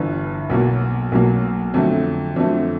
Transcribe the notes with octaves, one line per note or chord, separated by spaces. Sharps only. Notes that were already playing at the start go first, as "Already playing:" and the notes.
Already playing: G1 G2 E3
B1 B2 F#3 A#3
B1 B2 F#3 A#3
F2 D3 F#3 A3
F2 D3 F#3 A3